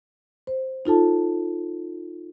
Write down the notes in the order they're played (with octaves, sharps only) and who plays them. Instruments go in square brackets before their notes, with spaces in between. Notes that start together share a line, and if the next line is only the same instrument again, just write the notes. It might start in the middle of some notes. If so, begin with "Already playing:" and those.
[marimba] C5
D#4 F4 A4 A5